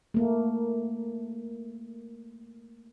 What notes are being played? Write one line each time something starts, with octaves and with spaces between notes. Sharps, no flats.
A3 A#3